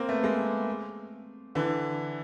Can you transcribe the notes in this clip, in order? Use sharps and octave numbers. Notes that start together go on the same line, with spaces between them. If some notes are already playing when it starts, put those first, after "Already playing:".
Already playing: A#3 C4
A3 B3
G#3 A#3
D3 E3